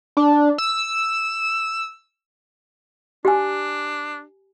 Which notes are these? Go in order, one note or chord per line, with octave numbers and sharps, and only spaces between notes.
D4
E6
D4 G4 G#5